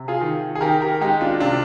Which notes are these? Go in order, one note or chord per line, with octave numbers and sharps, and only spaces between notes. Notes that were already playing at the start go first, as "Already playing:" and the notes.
Already playing: C3
F4 G#4
D#3
G#4
D#3 G4 A#4
G4 A#4
G#3 D#4 G4
D4 F4
C3 D4 F4